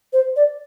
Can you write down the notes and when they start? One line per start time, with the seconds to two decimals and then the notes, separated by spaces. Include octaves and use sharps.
0.13 C5
0.36 D5